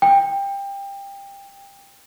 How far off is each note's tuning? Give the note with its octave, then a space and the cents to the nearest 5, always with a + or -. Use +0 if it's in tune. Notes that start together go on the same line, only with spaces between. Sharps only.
G5 +20